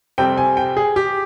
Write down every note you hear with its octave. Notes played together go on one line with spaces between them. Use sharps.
F2 C3 G3 C4 G5
G#5
G5
G#4
G4